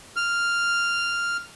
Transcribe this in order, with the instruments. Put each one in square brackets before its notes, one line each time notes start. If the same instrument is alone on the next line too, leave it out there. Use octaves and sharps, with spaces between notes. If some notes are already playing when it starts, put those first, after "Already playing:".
[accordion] F6